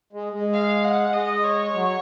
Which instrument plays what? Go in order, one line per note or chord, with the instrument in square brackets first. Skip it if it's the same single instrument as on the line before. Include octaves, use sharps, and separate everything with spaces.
[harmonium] G#3
G#3
[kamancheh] F5
F#5
[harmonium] G#3 [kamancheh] D#5
[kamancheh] C#5
[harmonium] F#3